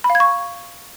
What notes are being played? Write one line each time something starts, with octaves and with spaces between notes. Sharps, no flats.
B5
F5
G#6
C#6